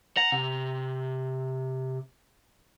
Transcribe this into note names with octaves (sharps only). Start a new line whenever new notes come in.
F#5 A#5
C3